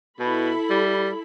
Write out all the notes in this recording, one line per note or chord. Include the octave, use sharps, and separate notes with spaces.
B2 E4 A4 B5
G3